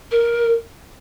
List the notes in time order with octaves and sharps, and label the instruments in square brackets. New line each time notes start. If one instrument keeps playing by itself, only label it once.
[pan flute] A#4